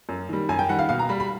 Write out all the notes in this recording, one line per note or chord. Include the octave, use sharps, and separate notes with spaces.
F#2
D#3 G3
F#2 G#5
G5
D#3 G3 F#5
F5
B2 F5
A#5
G3 B5
B5